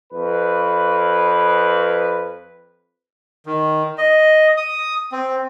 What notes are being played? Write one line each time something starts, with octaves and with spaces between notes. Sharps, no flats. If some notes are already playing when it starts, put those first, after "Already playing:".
F2 B4
D#3
D#5
D#6
C4